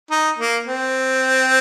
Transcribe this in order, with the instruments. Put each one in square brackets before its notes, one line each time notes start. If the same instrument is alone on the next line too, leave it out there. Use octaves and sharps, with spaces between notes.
[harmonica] D#4
A#3
C4